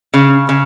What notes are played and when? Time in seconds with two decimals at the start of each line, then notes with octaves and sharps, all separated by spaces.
0.14 C#3
0.49 C#3